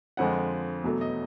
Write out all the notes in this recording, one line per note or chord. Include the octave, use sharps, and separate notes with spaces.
F2 D3 F3 G#3 F#5
E2 B2 F#3 A3
D#5